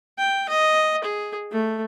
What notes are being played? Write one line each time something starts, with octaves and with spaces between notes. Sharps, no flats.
G5
D#5
G#4
A3